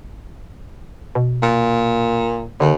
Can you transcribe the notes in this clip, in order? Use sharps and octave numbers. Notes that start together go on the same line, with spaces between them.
B2
A#2
D#2 D3